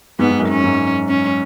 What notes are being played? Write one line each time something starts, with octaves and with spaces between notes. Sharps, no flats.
G#2 B3
G#2
F#2
G#2 C#4
G#2
C#4